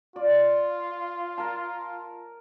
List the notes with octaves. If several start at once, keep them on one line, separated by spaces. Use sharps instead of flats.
F4 D5
A#4 A5